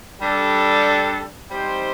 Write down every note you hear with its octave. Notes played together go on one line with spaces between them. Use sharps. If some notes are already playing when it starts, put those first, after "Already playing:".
G3 D4 A4
G3 C4 D#4 G4 C5